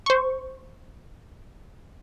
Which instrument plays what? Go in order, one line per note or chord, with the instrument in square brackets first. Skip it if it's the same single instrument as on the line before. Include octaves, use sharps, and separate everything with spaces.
[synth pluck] C5 C#6